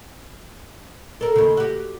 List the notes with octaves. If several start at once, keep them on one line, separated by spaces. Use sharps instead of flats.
A4 A#4
D#2 C#3
F#4 G4